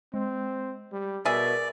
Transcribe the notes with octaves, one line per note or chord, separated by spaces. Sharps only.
G#3 C4
G3
B2 G#4 A#4 D5 E5